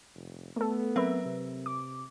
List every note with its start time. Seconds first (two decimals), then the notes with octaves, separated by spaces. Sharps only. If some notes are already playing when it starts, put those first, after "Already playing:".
0.15 F1
0.56 A3 B3 A4
0.96 F#3 C4 A#4 B4 E5
1.25 C3
1.66 D6